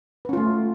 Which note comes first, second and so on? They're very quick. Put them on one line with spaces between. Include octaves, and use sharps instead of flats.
B4 C#4 F4 A3